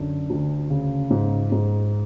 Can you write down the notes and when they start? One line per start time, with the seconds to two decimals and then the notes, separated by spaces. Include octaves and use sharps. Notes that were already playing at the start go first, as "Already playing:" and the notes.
Already playing: F#2 D3
0.30 D2
0.70 C#3
1.10 G#2
1.52 G#2